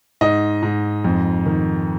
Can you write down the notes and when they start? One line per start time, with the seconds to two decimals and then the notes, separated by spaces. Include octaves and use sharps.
0.21 G#2 D#5
0.62 G#2
1.04 F2
1.46 D#3